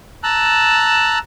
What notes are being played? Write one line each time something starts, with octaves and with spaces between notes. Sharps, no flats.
A5 A#5 E6 F#6